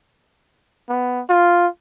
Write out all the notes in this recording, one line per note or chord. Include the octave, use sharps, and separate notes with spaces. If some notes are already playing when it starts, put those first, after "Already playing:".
B3
F4